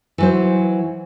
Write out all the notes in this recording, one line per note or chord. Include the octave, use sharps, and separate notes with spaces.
E3 F#3 C5